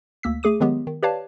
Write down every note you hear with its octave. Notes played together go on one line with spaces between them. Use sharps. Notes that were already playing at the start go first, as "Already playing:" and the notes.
D2 A#3 E6 B6
A3 G#4 D6 D#7
D#3 F#3 G#3 B3 G4
D#3
G4 B4 C#5 D5 F5 A5